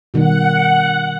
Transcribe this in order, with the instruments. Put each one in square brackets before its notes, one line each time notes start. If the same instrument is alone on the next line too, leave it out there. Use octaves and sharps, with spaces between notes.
[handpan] B2 D#3 G3 [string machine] F#5